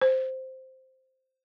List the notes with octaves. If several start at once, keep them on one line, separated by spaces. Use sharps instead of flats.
C5